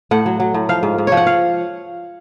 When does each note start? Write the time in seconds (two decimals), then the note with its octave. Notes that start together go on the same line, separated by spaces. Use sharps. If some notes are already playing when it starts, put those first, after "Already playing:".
0.11 A2 F#5
0.26 F#3
0.40 F#3
0.54 A2
0.69 F3 F5
0.83 G#2
0.98 G#2
1.07 F3 C#5
1.17 F#5
1.27 F5